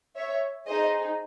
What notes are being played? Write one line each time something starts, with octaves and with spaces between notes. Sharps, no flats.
C#5 E5
D#4 G#4 C5 D#5